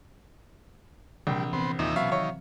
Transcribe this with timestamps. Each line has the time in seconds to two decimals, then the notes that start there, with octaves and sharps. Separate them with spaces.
1.27 A#1 C3 E3 G3
1.53 E3 B3 C4 C5
1.79 D#2 A#2 D#4 E5
1.96 B2 F#3 C#4 E5 F5
2.12 D#3 C#5